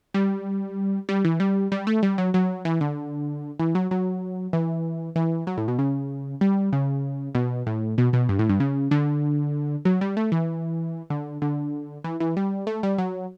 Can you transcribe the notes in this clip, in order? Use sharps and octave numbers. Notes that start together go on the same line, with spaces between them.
G3
G3
E3
G3
G3
A3
G3
F#3
F#3
E3
D3
E3
F#3
F#3
E3
E3
F#3
A2
B2
C#3
G3
C#3
B2
A2
B2
B2
G2
A2
G2
C#3
D3
F#3
G3
A3
E3
D3
D3
E3
E3
G3
A3
G3
F#3